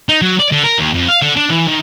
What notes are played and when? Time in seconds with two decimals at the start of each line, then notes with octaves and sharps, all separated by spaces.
0.09 D#4
0.22 F#3
0.39 D5
0.52 D3
0.64 A#4
0.78 D#2
0.94 F2
1.08 F5
1.22 D3
1.36 D4
1.50 E3
1.68 D#3